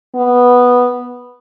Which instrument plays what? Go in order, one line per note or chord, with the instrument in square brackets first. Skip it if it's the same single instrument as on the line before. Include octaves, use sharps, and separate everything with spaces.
[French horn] B3